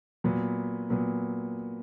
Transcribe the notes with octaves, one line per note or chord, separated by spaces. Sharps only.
A#2 F#3 B3
A#2 F#3 B3